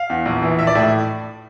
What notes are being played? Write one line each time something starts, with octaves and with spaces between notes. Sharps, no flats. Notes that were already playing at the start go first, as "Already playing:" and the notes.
Already playing: F5
E2
A#1
E3
A#1 E5
D5
A2 E5